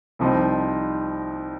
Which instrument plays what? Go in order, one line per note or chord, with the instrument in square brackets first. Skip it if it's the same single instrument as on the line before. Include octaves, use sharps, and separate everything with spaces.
[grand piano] C2 C3 F3 C4 D#4